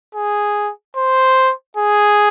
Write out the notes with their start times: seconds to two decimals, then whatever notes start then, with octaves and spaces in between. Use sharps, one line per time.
0.15 G#4
0.97 C5
1.77 G#4